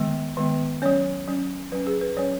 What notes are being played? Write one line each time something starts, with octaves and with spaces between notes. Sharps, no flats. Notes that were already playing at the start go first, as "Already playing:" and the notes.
Already playing: D#3 G#3 B3
D#3 G#3 B3
F#3 C#4 C#5
F#3 C#4
F#3 C#4 B4
G#4
B4
F#3 C#4 C#5